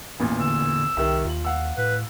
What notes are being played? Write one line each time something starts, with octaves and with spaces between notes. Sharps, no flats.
A1 E2 A#2
D3 E6
C2 D#3 G4 E5
D#2 F4 F#7
F5 F#5 E6
A2 B4